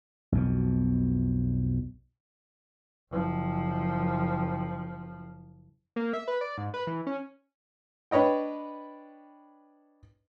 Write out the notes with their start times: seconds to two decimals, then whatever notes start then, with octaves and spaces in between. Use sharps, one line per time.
0.32 B1 F2 B2
3.11 F#1 F3
5.96 A#3
6.13 E5
6.28 B4
6.41 D5
6.58 G#2
6.74 B4
6.87 E3
7.07 C#4
8.11 D4 B4 C#5 D#5 G5